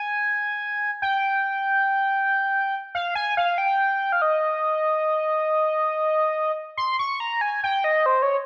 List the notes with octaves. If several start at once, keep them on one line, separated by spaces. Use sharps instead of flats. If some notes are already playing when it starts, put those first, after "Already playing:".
Already playing: G#5
G5
F5
G#5
F5
G5
F5
D#5
C6
C#6
A#5
G#5
G5
D#5
C5
C#5